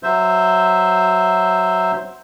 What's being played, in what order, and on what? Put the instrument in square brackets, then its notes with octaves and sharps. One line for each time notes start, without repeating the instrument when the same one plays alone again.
[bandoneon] F#3 C5 E5